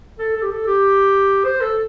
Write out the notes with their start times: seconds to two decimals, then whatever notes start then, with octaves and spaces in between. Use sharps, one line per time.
0.19 A4
0.35 A4
0.42 G4
0.51 A4
0.67 G4
1.44 C5
1.61 A4